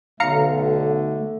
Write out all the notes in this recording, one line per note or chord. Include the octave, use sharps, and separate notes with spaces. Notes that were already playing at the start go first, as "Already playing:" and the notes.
B1 D3 A3 F5 A#5 C#7